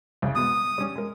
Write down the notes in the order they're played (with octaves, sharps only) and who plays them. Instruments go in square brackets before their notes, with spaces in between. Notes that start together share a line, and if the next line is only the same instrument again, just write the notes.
[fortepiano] C2 C#3
[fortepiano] B2 G#3 B3 [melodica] D#6
[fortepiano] G3 C#4
G#3 A#4